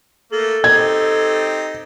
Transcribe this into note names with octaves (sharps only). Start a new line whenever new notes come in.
A3 A#3 A4
C4 D#4 G4 G#6